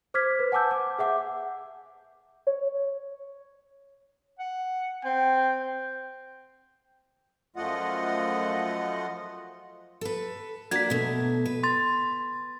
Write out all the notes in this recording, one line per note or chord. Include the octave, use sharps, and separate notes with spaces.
C5 D6 F6 G#6 B6
B4
F#5 G#5 A5 D6 E6 G6
D6
G#4 E5 F#5 D6
C#5
F#5
C4 G5
F#2 F3 A3 F4 D#5 F#5
A4 B4
A#3 D4 F#4 G#6 B6
B2 A3
B4
C6 A6